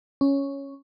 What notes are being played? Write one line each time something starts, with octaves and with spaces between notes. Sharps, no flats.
C#4